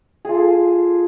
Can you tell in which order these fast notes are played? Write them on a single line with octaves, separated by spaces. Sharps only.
G#4 F4 A4